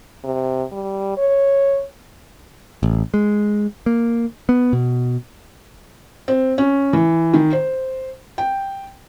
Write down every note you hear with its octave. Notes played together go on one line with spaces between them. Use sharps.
C3
G3
C#5
A1
G#3
A#3
B3
B2
C4
C#4
E3
D#3
C5
G5